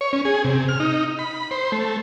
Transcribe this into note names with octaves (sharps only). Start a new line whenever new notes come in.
C#5
C#4
G#4
C3
F6
D#4
B5
C5
A3